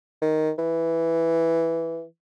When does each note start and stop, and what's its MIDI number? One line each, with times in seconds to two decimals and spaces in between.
0.22 0.50 51
0.58 2.04 52